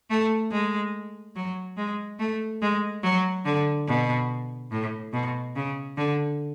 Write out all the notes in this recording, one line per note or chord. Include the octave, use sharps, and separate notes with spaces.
A3
G#3
F#3
G#3
A3
G#3
F#3
D3
B2
A2
B2
C#3
D3